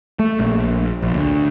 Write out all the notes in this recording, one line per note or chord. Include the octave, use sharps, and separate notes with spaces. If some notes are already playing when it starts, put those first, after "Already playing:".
A3
A#1
A#1
D2